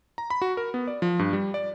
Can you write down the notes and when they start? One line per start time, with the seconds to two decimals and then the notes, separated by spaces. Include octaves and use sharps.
0.18 A#5
0.30 B5
0.42 F#4
0.57 A#4
0.74 B3
0.87 D5
1.02 F3
1.19 G2
1.33 G3
1.54 D5